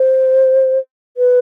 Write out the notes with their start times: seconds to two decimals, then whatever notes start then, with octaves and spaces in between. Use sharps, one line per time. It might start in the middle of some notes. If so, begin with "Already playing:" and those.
Already playing: C5
1.17 B4